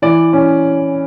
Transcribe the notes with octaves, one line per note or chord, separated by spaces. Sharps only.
E3 D5
C#4